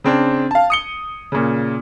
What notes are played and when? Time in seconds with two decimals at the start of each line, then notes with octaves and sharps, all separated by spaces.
0.04 C#3 C4 D4
0.51 F5 A5
0.70 D#6 C#7 G7
1.32 A#2 C#3